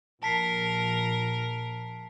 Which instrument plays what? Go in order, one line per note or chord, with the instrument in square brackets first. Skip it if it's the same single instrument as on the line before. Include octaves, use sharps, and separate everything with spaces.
[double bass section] A#1 [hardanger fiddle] A#4 [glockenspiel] A5 B6 C7